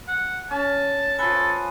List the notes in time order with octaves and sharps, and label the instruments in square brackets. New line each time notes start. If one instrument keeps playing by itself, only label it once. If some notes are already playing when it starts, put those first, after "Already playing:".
[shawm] F#5
[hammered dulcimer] C#4 [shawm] A5
[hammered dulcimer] F3 B4 [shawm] A4 [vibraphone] G#5 A5